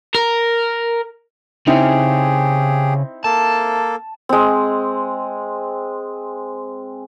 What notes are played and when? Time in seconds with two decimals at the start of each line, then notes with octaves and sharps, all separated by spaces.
0.15 A#4
1.67 C#3 C4 D#4 E4 G4 G#4
3.24 A#3 A4 A5
4.29 G#3 C4